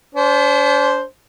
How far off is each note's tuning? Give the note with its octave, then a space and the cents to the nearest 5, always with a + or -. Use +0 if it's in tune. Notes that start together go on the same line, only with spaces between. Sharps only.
D4 -45 C5 +0